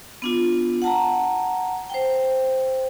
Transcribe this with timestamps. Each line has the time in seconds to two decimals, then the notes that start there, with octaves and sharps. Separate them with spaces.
0.22 B3 D4 F4
0.82 F#5 A5 A#5
1.90 C5 G5